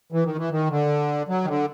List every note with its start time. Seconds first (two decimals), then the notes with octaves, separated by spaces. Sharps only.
0.12 E3
0.25 D#3
0.38 E3
0.51 D#3
0.70 D3
1.29 F#3
1.44 D#3
1.48 D3